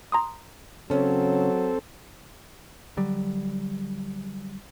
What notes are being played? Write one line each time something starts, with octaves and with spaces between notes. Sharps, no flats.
A#5 C6 D#6
C#3 F#3 C4 C#4 A4
D3 F#3 G3